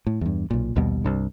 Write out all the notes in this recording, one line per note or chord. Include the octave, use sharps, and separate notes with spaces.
A2
E2 G2
B1 A#2
A#1 D#2 B2 G3
C2 G2